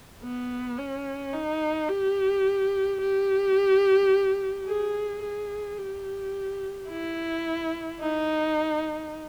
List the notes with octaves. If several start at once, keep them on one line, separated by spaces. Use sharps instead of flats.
B3
C#4
D#4
G4
G4
G#4
G#4
G4
E4
D#4